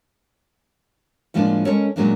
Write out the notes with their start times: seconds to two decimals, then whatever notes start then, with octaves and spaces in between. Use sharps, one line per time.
1.34 A2 F3 G#3 A#3 D4 F4
1.66 G#3 C#4 A4 A#4 C#5
1.96 A#2 F#3 G#3 A#3 C#4 D4